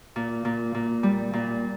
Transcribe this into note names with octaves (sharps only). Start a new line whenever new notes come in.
A#2
A#2
A#2
G3
A#2